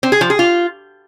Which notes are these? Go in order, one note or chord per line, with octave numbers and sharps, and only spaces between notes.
C4
G#4
F3
G#4
F4